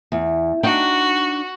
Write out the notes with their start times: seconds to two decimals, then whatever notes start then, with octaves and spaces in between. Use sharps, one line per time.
0.12 E2
0.63 D4 D#4 F#4 G5